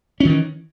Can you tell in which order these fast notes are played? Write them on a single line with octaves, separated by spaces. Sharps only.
C#4 D#3 E3